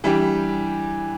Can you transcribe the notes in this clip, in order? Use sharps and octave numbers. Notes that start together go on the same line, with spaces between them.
E3 G3 D4 G4